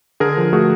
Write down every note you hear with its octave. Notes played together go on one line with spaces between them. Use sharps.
D3 G#4 A#4
F3
A3 F#4 G#4